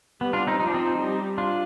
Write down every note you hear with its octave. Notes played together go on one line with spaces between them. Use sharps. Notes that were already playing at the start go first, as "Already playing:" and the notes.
G3 B3
D4 F4
C4 D#4
F3 D#4
D4
C4 D#4
G3
D4 F4